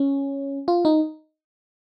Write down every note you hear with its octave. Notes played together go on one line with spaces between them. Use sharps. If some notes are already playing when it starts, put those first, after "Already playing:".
Already playing: C#4
F4
D#4